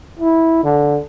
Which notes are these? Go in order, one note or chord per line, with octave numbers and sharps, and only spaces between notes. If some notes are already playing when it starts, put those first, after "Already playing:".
E4
D3